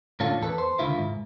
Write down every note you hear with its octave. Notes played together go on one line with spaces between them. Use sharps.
A2 D3 C#4 D4 F4 A4
E2 A4 B4
C5
C#2 D3 D#3 E4 F4 E5
G#2